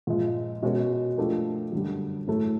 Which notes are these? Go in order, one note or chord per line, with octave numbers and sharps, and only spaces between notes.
A#2 F3 G#3
B2 G#3 C#4 F#4 A#4
F3 A3 D4 G4 A#4
F#2 D3 G3
A2 F#3 A3